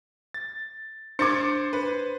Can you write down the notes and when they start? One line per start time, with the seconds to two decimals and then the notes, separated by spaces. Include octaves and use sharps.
0.34 A6
1.19 D4 C5 D6 G#6 A6 C#7
1.73 B4